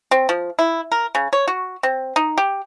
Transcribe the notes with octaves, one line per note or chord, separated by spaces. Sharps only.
C4
F3
E4
A#4
C#3
C#5
F#4
C4
D#4
G4